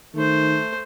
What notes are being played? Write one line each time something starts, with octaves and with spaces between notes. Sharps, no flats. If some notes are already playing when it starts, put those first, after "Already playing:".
D#3 A3 C5